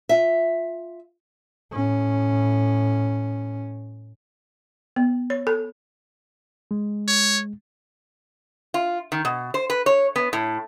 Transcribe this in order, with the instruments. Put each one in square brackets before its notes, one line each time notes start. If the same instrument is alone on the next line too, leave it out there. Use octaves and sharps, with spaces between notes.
[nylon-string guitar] F4 E5
[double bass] A2 C#4
[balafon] B3
C#5
A4
[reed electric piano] G#3
[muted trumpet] C#5
[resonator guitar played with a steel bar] F4
D#3
B2
C5
B4
C#5
B3
A2